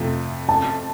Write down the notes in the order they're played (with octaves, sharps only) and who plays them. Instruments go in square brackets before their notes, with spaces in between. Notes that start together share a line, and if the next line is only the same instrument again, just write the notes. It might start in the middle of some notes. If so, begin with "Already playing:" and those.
Already playing: [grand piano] F2 C3 F3 A3
[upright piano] A5